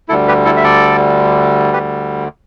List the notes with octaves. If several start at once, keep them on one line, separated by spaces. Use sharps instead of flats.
D2 D3 G3 E4 A4
G4 B4
E4 A4
E5
A4 D5
G4 B4